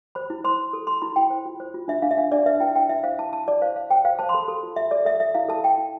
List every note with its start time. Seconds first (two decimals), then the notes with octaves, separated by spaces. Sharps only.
0.15 C5 B5
0.30 E4
0.44 C5 C6
0.59 E4
0.73 A4
0.87 A4 C6
1.02 E4 B5
1.16 E4 G5
1.30 C5
1.46 F4
1.60 C5
1.74 F4
1.88 D4 E5
2.02 D4 F5
2.11 E5
2.18 D4 F5
2.32 D4 D5
2.46 B4 E5
2.60 E4 G5
2.75 B4 G5
2.89 E4 E5
3.03 C5 F5
3.19 E4 A5
3.32 E4 A5
3.47 E4 D5
3.62 C5 F5
3.76 C5 F5
3.91 C5 G5
4.05 C5 F5
4.19 C5 A5
4.29 C6
4.33 A4 B5
4.48 A4
4.63 F4
4.76 A4 E5
4.91 A4 D5
5.05 A4 E5
5.20 A4 E5
5.35 E4 F5
5.48 A4 A5
5.63 A4 G5
5.78 E4